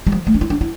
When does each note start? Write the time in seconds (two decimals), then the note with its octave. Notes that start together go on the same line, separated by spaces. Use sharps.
0.07 G3
0.12 F3
0.27 A3
0.34 D4
0.41 E4
0.50 D4
0.61 E4